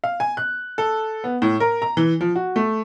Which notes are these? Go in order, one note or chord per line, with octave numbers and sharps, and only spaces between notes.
F5
G#5
F#6
A4
B3
A2
A#4
A#5
E3
F3
F#4
A3